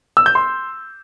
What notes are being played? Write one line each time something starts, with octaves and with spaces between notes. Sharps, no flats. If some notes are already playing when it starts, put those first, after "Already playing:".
E6
G6
C6